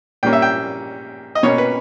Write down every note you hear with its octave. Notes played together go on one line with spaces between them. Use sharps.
A#2 G3 A#3 C#4 G5
E5
G5
D#5
B2 A#3 C#4 C#5
B4